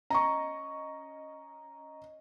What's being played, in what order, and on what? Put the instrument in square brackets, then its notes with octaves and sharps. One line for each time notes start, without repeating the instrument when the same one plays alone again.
[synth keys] C#4 D#5 [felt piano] A#5 C#6